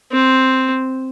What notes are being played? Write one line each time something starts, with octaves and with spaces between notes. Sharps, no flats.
C4